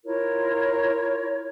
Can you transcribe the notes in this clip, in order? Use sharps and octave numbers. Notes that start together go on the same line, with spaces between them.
E4 F4 A#4 C#5